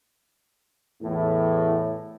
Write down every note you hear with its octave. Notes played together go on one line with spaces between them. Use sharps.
E2 A2